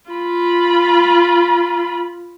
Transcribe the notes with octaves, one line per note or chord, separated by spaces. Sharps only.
F4 B5